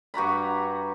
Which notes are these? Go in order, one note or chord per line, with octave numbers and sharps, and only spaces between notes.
G2 F#4 A#5 B5